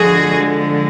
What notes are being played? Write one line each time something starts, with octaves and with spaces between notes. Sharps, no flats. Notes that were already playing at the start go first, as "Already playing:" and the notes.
Already playing: D3 F3 G#3 F#4 G#4